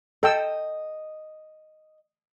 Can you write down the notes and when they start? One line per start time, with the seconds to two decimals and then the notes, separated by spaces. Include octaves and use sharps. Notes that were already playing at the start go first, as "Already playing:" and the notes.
0.23 A4 D#5 G5 E6